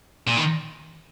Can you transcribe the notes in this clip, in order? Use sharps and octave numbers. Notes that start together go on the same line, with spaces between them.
A#2
D#3